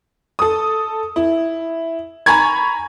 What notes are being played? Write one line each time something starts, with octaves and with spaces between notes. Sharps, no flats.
A4 D#6
E4
G#5 A#5 B5 C#6 G#6